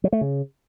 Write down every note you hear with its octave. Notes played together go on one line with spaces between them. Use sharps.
F#3
A3
C#3